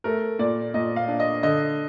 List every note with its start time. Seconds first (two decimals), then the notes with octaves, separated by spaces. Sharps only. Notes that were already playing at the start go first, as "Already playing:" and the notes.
0.04 A3 A#4
0.39 A#2 D5
0.74 A#2 D#5
0.96 F5
1.08 D4
1.20 D#5
1.43 D3 D#5